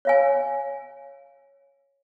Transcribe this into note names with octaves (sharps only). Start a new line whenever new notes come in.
C#5 F5 G#5